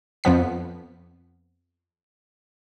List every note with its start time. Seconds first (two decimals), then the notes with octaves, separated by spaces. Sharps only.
0.24 F2 F3 B3 B6